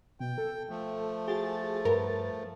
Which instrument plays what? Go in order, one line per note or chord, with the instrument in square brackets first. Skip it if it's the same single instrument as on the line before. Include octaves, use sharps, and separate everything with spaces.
[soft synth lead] B2 [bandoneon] G5
[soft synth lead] A4
[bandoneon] F3 A3
[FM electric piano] F#4 G#4 [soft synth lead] A6
[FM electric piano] G2 B4 [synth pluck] A#4